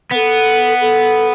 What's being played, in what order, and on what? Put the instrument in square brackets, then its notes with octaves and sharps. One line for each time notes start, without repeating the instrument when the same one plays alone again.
[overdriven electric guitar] B3 [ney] A4 B4
[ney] A4